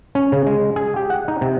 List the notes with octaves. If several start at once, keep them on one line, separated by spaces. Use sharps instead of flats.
C#4
C#3
G#3
G#4
G4
F#5
D#4
C3